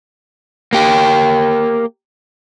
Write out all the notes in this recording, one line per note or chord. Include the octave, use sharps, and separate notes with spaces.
A#3 G4